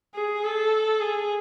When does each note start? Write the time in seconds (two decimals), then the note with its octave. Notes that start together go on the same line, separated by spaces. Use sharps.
0.15 G#4
0.44 A4
1.01 G#4